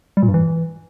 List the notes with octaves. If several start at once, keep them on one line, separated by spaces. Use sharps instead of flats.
G3
A#2
G2
E3